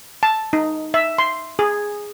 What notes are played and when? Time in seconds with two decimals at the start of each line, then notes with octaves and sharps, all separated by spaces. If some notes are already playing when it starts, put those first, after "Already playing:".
0.23 A5
0.53 D#4
0.94 E5
1.18 C6
1.59 G#4